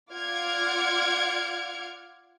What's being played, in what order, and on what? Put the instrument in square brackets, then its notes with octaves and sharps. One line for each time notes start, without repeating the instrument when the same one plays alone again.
[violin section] F4 D5 F#5 F6 G#6 D7